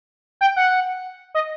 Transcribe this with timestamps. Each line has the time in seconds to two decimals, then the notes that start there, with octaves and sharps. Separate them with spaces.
0.41 G5
0.56 F#5
1.35 D#5